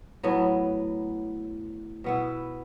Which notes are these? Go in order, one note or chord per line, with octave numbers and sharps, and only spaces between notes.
A2 F#3 B3
B2 B3 E4